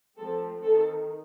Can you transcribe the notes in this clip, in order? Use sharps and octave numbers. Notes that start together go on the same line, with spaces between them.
F3 A3 C4 A4
D#3 A4